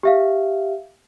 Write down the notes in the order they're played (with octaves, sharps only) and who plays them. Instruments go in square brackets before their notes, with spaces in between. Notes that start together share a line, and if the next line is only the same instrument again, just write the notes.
[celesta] G4 E5 F5